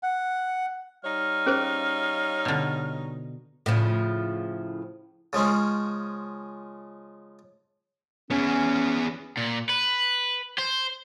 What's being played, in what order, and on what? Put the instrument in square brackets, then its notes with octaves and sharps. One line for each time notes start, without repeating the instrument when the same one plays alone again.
[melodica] F#5
[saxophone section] G3 D#4 C#5 [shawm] F5
[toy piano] C#4 G#4 C5
[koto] B2 D3
[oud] A2 C#3 F3
[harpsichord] C#3 F3 G#3 C#4
[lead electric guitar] B3 G#4 [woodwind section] C#4
[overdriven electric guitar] A#2
B4
C5